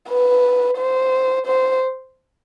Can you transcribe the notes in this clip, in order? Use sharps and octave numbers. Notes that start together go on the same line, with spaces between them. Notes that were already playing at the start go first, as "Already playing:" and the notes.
B4
C5
C5